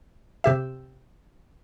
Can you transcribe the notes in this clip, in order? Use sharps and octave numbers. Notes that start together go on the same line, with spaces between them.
C3 G4 E5